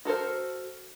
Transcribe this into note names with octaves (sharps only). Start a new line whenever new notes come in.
F#4 A4 A#4 C5